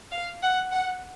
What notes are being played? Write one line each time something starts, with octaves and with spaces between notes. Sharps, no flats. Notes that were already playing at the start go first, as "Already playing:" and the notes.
F5
F#5
F#5